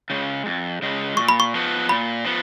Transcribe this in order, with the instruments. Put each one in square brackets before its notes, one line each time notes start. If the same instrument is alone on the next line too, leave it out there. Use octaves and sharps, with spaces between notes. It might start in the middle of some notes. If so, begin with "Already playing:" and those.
[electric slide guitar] C#3 G#3
F2
C#3 G#3
[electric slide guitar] A#2 [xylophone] C#6
[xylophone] B5
C#6
[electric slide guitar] F3 B3
[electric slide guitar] A#2 [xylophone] B5
[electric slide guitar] F3 B3